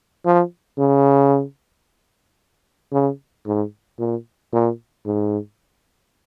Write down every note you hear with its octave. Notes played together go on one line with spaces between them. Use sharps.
F3
C#3
C#3
G#2
A#2
A#2
G#2